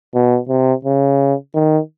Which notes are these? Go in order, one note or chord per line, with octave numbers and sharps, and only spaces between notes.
B2
C3
C#3
D#3